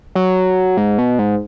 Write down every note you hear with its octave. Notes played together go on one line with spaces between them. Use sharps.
F#3
G#2
B2
G#2